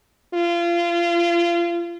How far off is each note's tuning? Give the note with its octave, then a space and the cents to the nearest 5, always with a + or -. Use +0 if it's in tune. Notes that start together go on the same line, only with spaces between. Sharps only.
F4 -30